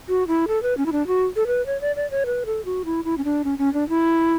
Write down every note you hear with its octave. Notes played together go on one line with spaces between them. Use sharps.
F#4
E4
A4
B4
C#4
E4
D4
F#4
A4
B4
C#5
D5
D5
C#5
B4
A4
F#4
E4
E4
C#4
D4
C#4
C#4
D4
E4